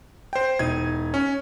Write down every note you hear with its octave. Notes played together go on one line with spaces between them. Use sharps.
C5 G5
E1 D#4 G#6 D#7
C#4